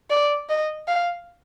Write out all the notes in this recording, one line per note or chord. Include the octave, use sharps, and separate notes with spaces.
D5
D#5
F5